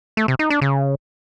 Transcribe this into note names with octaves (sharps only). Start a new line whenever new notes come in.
A3
C3
D#4
D4
C#3